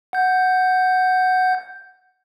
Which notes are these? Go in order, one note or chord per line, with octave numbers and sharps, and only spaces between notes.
F#5 G6